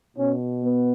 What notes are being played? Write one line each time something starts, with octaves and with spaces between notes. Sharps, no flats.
B2 C#4
B3